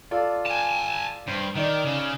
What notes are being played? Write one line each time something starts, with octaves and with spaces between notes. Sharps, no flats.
F4 A4 D5
G#5 A5
G2 C5
D#3 D#4 D5
C#3